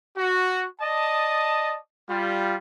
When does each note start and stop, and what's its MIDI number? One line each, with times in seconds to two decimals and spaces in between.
0.17 0.65 66
0.81 1.75 74
0.81 1.75 75
0.81 1.75 81
0.81 1.75 87
2.08 2.54 55
2.08 2.54 65